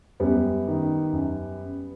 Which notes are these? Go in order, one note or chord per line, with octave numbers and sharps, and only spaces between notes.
F#2 G3 B3
D#3
F#2